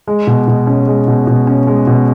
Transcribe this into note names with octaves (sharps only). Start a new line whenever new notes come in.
G#3
B2
B2
C#4
G#3
B2
B2
C#4
G#3
B2